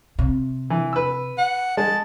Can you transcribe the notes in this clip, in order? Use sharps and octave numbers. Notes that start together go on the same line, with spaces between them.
C3
E3
B4 E6
F#5
G#3 A5